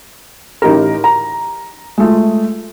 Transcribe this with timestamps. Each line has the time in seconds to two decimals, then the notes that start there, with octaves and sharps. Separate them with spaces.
0.62 A1 D#4 G4 A#4
1.04 A#5
1.98 G#3 A3 F4